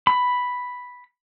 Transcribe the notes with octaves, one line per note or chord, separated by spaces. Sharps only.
B5